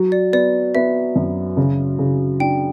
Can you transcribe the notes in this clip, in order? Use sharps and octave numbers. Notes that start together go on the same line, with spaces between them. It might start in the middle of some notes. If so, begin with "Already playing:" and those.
Already playing: F#3
D5
B3 D5
B3 E5
F#2
C#3
C#3
D4 G5